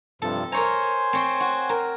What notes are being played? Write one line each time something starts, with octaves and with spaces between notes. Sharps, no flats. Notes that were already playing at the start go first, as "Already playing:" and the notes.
G2 C3 F3 A4
A#4 C5 C#5 G#5 A#5
C4 C#5 C6
F#4
A#4